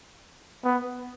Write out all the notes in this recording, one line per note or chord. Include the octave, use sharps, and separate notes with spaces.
B3